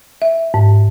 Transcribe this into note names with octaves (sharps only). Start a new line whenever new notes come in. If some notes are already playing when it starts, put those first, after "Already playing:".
E5
G#2